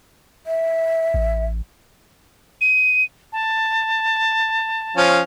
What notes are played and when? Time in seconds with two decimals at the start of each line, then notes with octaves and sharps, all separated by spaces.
0.47 E5
1.14 A1
2.61 D#7
3.32 A5
4.97 F3 C#4 F5